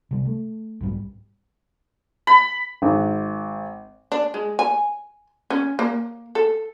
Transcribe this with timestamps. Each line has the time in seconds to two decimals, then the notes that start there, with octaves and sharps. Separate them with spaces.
0.11 C3 G3
0.25 A3
0.81 B1 G#2 G3
2.27 B5
2.82 G#1
4.12 D4
4.34 G#3
4.59 G#5
5.50 C#4
5.79 A#3
6.35 A4